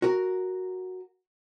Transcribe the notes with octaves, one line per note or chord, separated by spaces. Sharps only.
F#4 A#4